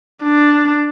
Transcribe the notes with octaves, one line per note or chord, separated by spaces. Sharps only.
D4